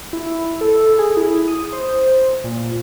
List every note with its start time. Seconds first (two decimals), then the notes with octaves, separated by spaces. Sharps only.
0.13 E4
0.61 A4
0.99 G#4
1.17 E4
1.48 D#6
1.73 C5
2.44 A#2